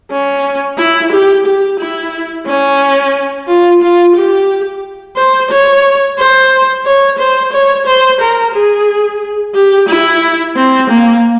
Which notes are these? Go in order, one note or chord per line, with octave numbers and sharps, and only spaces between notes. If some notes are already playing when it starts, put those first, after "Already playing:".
C#4
E4
G4
G4
E4
C#4
F4
F4
G4
C5
C#5
C5
C#5
C5
C#5
C5
A#4
G#4
G4
E4
C4
A#3